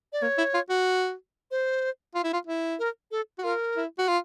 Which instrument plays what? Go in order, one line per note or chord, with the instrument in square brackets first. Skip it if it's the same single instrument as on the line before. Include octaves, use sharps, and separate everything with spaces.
[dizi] D5
[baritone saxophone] A#3 [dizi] C#5
[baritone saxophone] E4
F4
F#4
[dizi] C5
[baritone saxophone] F4
E4
F4
E4
[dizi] A#4
A4
[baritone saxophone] F#4
[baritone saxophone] F4 [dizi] A#4
[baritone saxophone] E4
F#4
F4